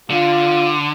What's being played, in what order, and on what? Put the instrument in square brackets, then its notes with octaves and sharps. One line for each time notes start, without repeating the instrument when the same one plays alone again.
[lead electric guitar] D3 [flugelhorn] F4